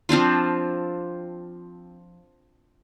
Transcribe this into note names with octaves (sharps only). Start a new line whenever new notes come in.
F3 C4 D4 F4